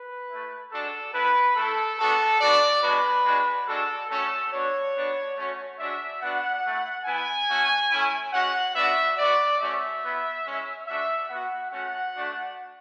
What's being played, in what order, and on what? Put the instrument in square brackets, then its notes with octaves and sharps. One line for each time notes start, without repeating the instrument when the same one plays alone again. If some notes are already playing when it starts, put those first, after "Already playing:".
Already playing: [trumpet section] B4
A3 E4
G#3 D4 F#4 A4
B3 E4 B4
A3 E4 A4
B3 D4 F#4 A4
B3 D4 F#4 D5
G#3 B3 D4 F#4 B4
G#3 D4 F#4
G#3 D4 F#4 A4
A3 C#4 F#4 A4
B3 D4 F#4 C#5
B3 D4 F#4
A3 C#4 F#4
G#3 D4 F#4 E5
B3 D4 F#4 F#5
A3 E4
B3 E4 G#5
A3 C#4 F#4
A3 C#4 E4
G#3 C#4 F#4 F#5
B3 D4 F#4 E5
B3 F#4 D5
A3 C#4 F#4 E5
B3 E4
G#3 C#4 E4
A3 D4 F#4 E5
B3 F#4 F#5
A3 C#4 F#4 F#5
A3 D4 F#4